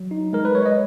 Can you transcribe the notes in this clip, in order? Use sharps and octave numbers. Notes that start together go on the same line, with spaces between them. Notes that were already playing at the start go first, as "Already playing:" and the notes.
Already playing: F#3
D#4
G#3 A#4
B4
G#3 C#5
D#5